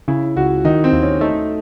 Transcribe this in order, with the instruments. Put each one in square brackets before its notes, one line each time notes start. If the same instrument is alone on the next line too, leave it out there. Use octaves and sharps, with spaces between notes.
[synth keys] C#3 [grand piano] E4
[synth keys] C#2 [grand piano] F#4
[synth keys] D#3 [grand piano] D#4
[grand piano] C4
[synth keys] D#2
[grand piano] C#4
[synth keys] A3 [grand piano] D#4